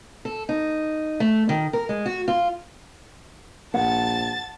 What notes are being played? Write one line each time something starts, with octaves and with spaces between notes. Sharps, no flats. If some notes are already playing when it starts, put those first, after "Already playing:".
A4
D#4
A3
D#3
A#4
G#3
F#4
F4
A#1 F#5 A5 A6